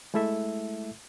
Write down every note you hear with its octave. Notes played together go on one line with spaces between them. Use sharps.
G#3 A3 E4 A4 E5